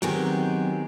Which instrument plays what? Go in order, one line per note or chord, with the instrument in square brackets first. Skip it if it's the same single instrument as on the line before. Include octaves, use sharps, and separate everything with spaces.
[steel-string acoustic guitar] D#3 G#3 G4 [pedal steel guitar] F#3 B3 C4